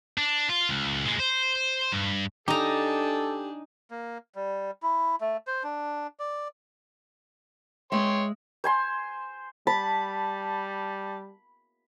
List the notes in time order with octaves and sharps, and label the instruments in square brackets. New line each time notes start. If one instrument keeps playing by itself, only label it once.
[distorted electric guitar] D4
F4
C#2
A#2 G#3
C5
G2
[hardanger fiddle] D4 G#5 [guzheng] D#4 A#5 [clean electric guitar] G4 [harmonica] A4
[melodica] A#3
G3
E4
A3
C5
D4
D5
[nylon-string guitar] G#3 E5 [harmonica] C#5 G5 C6
[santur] C5 G#5 C6
[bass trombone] G3 [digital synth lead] A5 [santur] B5